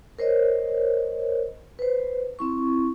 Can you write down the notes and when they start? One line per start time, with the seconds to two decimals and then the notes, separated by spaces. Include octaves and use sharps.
0.19 A#4 C5 C#5 D#5
1.79 B4 C5
2.39 C4 E4 C#6